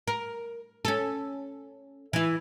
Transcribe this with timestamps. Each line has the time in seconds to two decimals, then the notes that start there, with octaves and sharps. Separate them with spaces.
0.08 A#4
0.85 C#4 A4
2.13 E3 E4